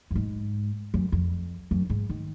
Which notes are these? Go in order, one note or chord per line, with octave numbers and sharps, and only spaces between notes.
F#2
G#2
F#2
F2
F#2
G#2
D#3